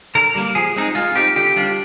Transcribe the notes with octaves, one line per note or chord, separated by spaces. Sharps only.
D3 A#4
G3 A#3
F3 G#4
G#3 C4 D#4
G#3 F4
C4 D#4 G4
D3 G4
G3 D4 F4